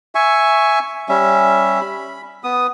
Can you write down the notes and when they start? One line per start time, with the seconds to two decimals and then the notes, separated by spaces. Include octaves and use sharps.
0.15 E5 G#5 C#6
1.09 G3 C#4 E5
1.81 B5
2.44 B3 D#6